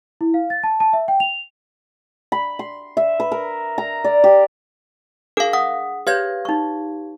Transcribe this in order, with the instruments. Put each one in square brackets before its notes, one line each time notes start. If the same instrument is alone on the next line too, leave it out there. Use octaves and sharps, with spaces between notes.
[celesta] E4
F5
A6
A5
A5
E5
G5
F7
[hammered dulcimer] B5
C6
E5
B4
A#4
A#5
D5
G4
[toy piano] D4 G#4 D6 [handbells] A#4 F5
[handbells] F#5 [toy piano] D#6
[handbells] G4 F5 G#6 [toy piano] B4 C#5
[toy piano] D#4 C#6